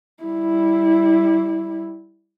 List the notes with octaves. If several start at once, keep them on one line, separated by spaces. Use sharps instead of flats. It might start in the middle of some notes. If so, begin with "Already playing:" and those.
G3 E4